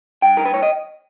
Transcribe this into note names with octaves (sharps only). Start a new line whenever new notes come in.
G2 G5
A#4
B4
C#5
D#5